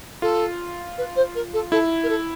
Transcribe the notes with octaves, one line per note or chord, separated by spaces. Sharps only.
F4 A4
B4
C5
A#4
A4
E4 A4
A#4
A4